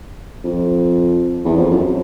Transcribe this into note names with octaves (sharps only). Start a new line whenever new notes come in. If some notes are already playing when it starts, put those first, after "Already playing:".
F2
E2
F2
F#2